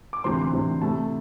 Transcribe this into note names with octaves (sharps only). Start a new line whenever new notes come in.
D6
D2 C3 E3 C4 C6
C6
D2 C3 E3 C4
C3 A3 E4 A5